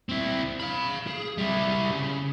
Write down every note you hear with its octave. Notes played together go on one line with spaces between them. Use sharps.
C4 E4
F5 B5
G#4
G3 E4
C#3